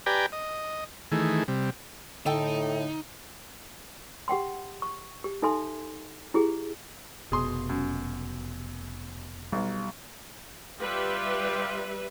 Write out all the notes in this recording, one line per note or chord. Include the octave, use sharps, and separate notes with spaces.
G4 B4 D5 G5 G#5 A#5
D#5
D#3 E3 A3 G#4
C3 G3
A2 D3 D#4 A4 G5 A5
G4 F#5 G5 C6
C#6
G4
D#4 A4 E5 G#5 C6
E4 G4 G#4
F1 B2 G#4 C6
F#2
B1 G3
G3 F4 G4 B4 E5